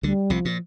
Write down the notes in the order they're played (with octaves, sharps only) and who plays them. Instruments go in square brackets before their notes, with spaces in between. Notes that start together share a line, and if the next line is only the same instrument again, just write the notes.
[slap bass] D2 D3 [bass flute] G3
[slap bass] C2 C3 [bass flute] F3
[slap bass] A#2